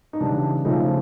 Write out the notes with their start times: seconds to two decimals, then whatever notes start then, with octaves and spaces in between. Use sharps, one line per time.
0.13 D#4
0.20 C#3 E3 G3 D4
0.65 C#3 F3 A3 D#4